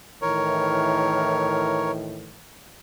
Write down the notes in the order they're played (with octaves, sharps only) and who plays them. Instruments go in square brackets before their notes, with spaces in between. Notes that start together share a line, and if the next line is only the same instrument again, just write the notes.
[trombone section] A2 D#3 E3 [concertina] A#4 C#5